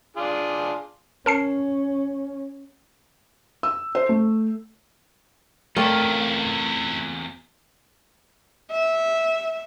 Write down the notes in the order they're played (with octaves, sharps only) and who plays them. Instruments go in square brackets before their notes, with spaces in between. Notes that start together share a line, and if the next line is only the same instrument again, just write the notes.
[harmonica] D4 F4 G#4
[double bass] C#4 [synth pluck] A#4 A5 C7
[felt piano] E6
C5
A3
[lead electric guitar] E2 F4 [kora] A3 C4 D5 [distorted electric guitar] C#4 E4 [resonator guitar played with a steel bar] A#4
[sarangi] E5